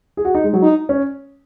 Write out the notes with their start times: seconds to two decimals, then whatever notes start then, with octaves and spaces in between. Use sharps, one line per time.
0.17 G#4
0.25 F#4
0.35 D#4
0.44 G#3
0.53 F#3
0.63 D#4
0.89 C#4